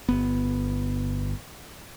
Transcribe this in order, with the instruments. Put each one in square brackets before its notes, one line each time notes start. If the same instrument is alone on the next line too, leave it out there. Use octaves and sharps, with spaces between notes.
[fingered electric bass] G1 B3